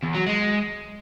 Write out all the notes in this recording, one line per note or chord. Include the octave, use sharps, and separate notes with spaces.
E2
F#3
G#3